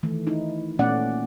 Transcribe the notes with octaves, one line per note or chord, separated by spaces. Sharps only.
D#3 E3 A3
D#4 E4
A#2 A3 B3 C#4 D5 F#5